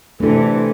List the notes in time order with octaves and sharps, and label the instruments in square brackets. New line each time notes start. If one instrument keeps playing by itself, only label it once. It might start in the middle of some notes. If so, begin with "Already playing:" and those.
[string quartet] C3 E3 [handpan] A3 D4 A4